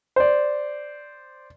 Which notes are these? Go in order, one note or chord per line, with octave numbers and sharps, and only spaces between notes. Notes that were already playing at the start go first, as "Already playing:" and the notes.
C5 D5